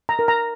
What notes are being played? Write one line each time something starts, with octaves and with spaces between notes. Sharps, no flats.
A#5
A#4
A#5